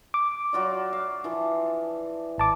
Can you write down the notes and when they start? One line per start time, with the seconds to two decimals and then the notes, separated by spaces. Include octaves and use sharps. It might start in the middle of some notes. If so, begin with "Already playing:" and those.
0.14 D6
0.53 F#3 F4 D5
0.93 F5
1.24 E3 F3
2.38 G#1 A5 D6